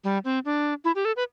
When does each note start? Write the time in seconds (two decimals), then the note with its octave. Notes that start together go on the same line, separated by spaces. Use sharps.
0.04 G3
0.25 C4
0.45 D4
0.85 E4
0.95 G4
1.05 A4
1.16 B4